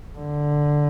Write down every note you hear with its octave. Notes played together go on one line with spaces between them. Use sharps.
D3